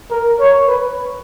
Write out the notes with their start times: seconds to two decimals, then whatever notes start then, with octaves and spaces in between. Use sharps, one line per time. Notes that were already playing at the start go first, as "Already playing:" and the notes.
0.11 A#4
0.40 C#5
0.67 B4